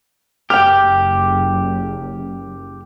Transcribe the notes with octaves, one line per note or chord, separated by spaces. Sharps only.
F#1 G4 G5 F6